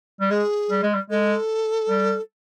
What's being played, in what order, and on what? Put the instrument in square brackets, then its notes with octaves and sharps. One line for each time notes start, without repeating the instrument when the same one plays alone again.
[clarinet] G3
[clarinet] G#3 [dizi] G#4
[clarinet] G3
G#3
G3
[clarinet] G#3 [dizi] A4
[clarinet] G3